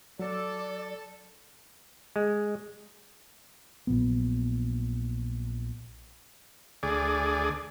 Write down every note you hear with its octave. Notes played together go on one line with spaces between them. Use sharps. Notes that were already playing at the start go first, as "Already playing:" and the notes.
F#3 A4 D5
G#3
A#1 A#2 F#3 B3
D2 G#4 D5